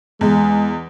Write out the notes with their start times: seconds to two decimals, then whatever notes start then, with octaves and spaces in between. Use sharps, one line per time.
0.21 E2 G#3